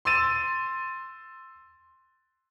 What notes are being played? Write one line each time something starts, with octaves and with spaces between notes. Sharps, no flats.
C6 E6 A6 D#7 E7